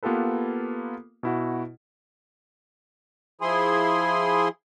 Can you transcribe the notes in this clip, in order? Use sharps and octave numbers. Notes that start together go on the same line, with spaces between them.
A#3 B3 F4 G4 A4 B4
B2 E4 F#4
F3 E4 G#4 G#5 C6